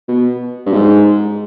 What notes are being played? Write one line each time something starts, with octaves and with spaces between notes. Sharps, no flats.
B2
G2
G#2